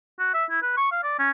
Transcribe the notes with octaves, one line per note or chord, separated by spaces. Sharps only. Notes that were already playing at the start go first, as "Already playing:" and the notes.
F#4
E5
E4
B4
C#6
F5
D5
C#4